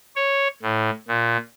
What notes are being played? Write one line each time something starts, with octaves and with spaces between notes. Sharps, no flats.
C#5
A2
A#2